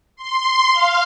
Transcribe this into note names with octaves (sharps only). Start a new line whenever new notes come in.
C6
F5